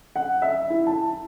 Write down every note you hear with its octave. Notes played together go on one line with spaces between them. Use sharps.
F#5
E5
E4
A5